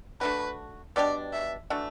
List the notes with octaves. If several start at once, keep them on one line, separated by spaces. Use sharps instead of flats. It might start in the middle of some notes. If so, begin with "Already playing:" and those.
A3 D4 F#4 B4
B2 G3 D4 G4 D5
E5
E3 A3 D4 F#4